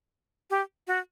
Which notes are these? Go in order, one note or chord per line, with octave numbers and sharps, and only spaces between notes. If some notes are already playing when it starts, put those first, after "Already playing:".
G4
F#4